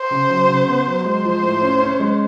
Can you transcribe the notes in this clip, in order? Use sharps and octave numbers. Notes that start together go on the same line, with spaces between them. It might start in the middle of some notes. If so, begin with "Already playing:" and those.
Already playing: C5
C#3
F#3
C#3
B3
F#3
G#3 C5
F3
A2
C#4
C#4
G#3